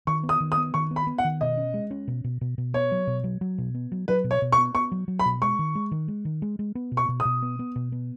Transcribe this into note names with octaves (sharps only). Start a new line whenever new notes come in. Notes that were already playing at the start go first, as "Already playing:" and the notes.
D#3 C#6
B3
D#6
D#3
D#6
B3
D#3 C#6
B3
B5
B3
F#5
D#3
B2 D#5
C#4
G#3
C#4
B2
B2
B2
B2
B3 C#5
F#3
B2
F#3
F#3
B2
B3
F#3
F#3 B4
B2
C#5
B2
C#6
B3
B3 C#6
F#3
F#3
B5
B2
G#3 C#6
D#3
G#3
D#3
G#3
D#3
G#3
G#3
B3
B2
C#6
B2
D#6
B2
B3
B3
B2
B3